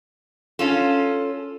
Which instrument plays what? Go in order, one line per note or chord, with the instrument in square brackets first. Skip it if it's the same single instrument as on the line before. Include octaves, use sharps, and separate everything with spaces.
[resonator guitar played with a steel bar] C#4 F4 A4